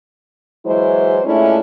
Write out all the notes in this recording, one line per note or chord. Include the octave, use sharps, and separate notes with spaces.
E3 F#3 G#3 E4 C5
A#2 G#3 A3 C#4 D4 E4